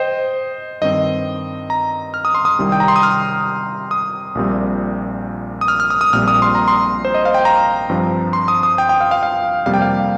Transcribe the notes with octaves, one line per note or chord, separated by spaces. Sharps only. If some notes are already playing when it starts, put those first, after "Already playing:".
Already playing: C5 D#5 G5
G2 D#3 C4 D#5
A#5
F6
D#6
C6
D#6
C2 C3 D#3 G3 C4
G5
A#5
C6
D#6
F6
D#6
A#1 A#2 G3 C4
D#6
F6
F6
D#6
D#6
A#1 A#2 G3 C4 F6
D#6
C6
A#5
C6
C5
D#5
F5
G5
A#5
G2 F3 C4
C6
D#6
D#6
G5
G5
F5
F5
F5
F2 C3 G3 A#3 F5
G5
F5